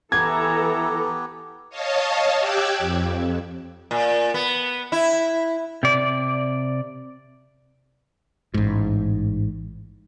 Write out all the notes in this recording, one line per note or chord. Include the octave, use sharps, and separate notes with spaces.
E3 B3 G4 A4 A#5 G#6
C#5 D#5 F5 A5
G4 G5 D6 E6 F#6 G#6
F2
A#2
B3
E4
C3 D5
A1 G#2